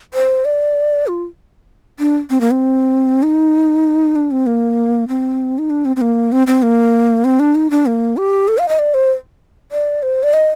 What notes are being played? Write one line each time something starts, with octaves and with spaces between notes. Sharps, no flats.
C5
D5
F4
D4
C4
A#3
C4
D#4
D4
C4
A#3
C4
D#4
D4
C4
C4
A#3
C4
C4
A#3
C4
D4
D#4
D4
A#3
G4
A4
F5
D#5
D5
C5
D5
C5
D5
D#5